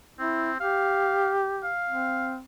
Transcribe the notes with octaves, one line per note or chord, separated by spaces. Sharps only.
C4 E4
G4 F5
F5
C4